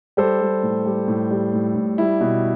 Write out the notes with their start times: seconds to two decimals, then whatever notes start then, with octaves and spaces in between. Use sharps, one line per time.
0.17 G3 A4 C5
0.41 G3
0.63 A2
0.86 G3
1.08 A2
1.31 G3
1.53 A2
1.76 A2
1.98 G3 E4
2.21 B2